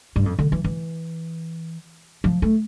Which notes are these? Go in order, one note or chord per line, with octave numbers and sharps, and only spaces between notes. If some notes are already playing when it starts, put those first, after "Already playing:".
G2
F2
D3
E3
E3
F3
A3